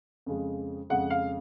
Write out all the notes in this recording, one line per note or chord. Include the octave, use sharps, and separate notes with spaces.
F2 C#3 G#3
F2 C#3 G#3 F#5
F5